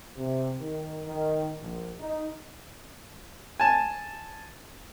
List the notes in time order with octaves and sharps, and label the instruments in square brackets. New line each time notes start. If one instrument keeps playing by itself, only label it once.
[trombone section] C3
D#3
D#3
A#1
D#4
[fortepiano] G#5 A5